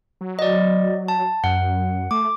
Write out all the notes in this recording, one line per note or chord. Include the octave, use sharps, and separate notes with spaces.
F#3
D5 D#5
A5
F#2 F#5
A3 D6